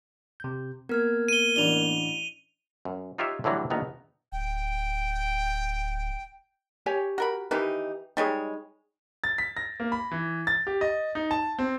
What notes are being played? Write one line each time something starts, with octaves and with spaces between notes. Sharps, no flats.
C3 G6
A#3 B3 A#4 F6 G#6
D#7 G7
A1 D4 D5 F7 G7
F#2
D#4 F4 G4 C#5 E5
A2 D3 E3 F#3 G3
A#1 D#3 A3 B3 A#5
D1 G5
G4 C#5 G#5
F#4 A#4 B5
D#3 E3 D#4 G4 B4
G3 G#3 D#4 G#4 C#5
A6
B6
A#6
A#3
B5
E3
A6
G4
D#5
D#4
A5
C4